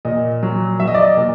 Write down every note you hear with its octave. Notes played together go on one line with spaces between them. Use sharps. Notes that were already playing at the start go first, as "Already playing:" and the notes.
A#2 D#5
F#3
F#3 E5
D#5
D5
D#5
A#2